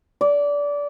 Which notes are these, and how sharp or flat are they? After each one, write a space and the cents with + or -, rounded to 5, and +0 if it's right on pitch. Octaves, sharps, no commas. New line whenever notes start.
D5 -20